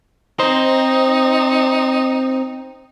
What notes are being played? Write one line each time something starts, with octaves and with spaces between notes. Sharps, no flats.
C4 D#4 C5